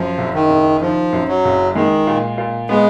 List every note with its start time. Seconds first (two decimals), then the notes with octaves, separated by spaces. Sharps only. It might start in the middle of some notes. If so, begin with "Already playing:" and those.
Already playing: F#2 F3
0.18 F#1
0.34 D#3
0.49 F#1
0.81 D#3 F3
1.13 F#2
1.28 F#3
1.45 F#1
1.75 D#3 G#3
2.07 A#2
2.38 A#2
2.69 G#3 B3